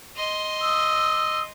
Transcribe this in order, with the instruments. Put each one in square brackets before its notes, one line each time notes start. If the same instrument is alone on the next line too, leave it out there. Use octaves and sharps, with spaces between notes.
[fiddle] D#5 C6
[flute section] D#6 E6